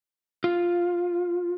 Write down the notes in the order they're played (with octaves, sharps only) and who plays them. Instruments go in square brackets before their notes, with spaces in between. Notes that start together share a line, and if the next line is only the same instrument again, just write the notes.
[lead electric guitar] F4